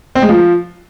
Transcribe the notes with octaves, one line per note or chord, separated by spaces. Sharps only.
C4
G#3
F3